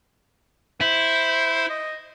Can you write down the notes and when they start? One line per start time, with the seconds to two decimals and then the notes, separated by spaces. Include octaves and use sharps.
0.81 E4 C5
1.69 D#5